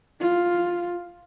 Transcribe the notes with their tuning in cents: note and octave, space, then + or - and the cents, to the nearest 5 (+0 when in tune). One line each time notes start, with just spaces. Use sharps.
F4 +5